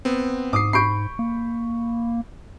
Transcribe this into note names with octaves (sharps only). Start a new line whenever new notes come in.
B3 C4
G#2 D6 D#6 C7
B5 C#6 G6 C7 D7
A#3